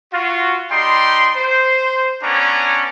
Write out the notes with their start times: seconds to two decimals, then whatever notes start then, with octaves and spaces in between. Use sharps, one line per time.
0.13 F4 F#4
0.71 G3 D#4 G5 C6
1.36 C5
2.23 B3 C#4 D4 G4 C#5 A#5